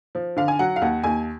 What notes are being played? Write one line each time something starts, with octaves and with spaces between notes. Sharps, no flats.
F3
D3 F5
G#5
F#3 F#5
F5
D#2 F#5
D#2 G#5